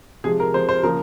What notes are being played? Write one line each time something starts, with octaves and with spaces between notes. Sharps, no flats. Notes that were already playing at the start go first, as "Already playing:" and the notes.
C3 F3 G#3 G#4
A#4
C3 F3 G#3 C5
C5
C#3 F3 A#3 A#4